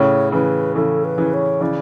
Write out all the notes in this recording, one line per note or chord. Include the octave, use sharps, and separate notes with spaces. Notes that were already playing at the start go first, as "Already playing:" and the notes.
Already playing: A2 C#3 C#5
C#3 E3 B4
C#3 E3 A4
B4
C#3 E3
C#5
C#3 E3 D5